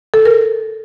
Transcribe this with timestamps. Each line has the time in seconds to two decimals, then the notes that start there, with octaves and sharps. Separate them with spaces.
0.14 A4
0.25 A#4